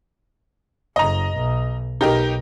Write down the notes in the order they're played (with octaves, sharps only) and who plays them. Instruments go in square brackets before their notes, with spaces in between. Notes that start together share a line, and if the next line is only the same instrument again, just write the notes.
[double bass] F#1 [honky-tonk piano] D#5 A#5
[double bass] B1
[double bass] B1 [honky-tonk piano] D#4 G4 A#4